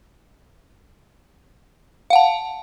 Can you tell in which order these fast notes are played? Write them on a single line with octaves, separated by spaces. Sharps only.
F5 F#5 A5